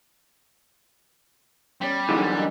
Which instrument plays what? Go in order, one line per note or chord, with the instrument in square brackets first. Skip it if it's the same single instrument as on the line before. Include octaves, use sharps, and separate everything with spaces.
[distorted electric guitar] G3 [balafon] B3 C#4 C#5
[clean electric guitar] F#2 D3 E3 [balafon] D#4 E4 G#4
[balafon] D#5 F#5 A#5